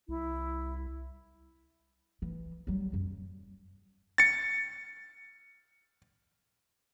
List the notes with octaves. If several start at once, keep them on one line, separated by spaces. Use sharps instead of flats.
C2 E4
E3
F#3 G3
F#2
A6 C#7